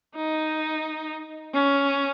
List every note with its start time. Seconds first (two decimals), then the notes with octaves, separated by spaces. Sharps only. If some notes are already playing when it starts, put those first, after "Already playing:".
0.15 D#4
1.54 C#4